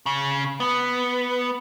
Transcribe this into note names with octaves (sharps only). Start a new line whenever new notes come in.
C#3
B3